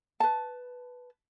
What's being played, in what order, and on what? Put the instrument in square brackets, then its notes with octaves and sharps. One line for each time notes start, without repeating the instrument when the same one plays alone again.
[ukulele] B4 A5